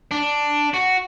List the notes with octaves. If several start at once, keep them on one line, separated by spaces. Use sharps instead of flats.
D4
F#4